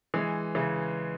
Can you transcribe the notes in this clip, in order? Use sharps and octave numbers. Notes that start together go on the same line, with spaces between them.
E3 G#3
C#3 E3